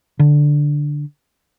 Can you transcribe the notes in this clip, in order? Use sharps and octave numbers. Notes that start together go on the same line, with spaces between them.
D3